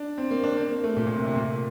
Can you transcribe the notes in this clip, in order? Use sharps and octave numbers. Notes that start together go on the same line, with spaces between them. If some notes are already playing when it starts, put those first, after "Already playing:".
Already playing: D4
C4
A#3
D4
C4
A#3
A3
A#2
A#2
C3
C3
A#2